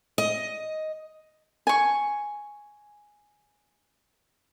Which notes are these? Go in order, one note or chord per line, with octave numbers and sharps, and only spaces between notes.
D#5
G#5 C#6